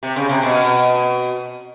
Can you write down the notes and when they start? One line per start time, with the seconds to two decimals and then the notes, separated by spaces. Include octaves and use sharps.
0.03 C3
0.16 C#3
0.29 C3
0.43 B2